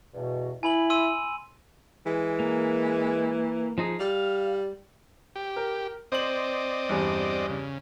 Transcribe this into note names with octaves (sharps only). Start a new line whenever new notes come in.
E2 G2 B2
E4 G#5 B5 F#7
C6 E6 D#7
E3 G#3
A#3
F3 D#4 G#4
G3 F5
G4
A#4
C4 C5 D5 D#5 F#7
E2 G2
C#3